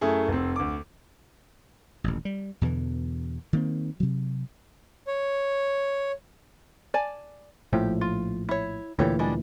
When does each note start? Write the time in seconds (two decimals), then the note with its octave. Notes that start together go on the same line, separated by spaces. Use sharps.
0.01 F#2 A3 E4 G#4
0.28 F1 C4
0.56 D2 D6
2.04 D#1 A1
2.25 G3
2.61 E2 B2 D3 E3
3.53 D#3 A#3 C4
4.00 C3 F#3
5.07 C#5
6.94 D5 G#5 A5
7.73 A#1 A2 F3 G4
8.01 F4
8.49 E4 C#5
8.99 D2 A#2 E3 G4 A4 C#5
9.19 G3 G#3 D4